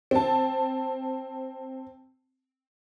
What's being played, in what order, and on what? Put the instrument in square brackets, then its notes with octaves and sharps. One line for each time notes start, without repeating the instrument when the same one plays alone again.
[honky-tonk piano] C4 A5